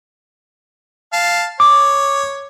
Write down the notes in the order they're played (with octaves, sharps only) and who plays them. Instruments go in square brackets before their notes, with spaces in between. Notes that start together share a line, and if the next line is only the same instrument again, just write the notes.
[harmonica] F5 A5
[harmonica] C#5 [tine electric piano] D6